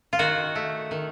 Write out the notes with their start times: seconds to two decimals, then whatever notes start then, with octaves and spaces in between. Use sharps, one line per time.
0.13 F4
0.19 D#3 F#4
0.55 A3
0.91 D#3